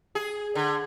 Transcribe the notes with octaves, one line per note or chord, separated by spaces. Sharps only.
G#4
D3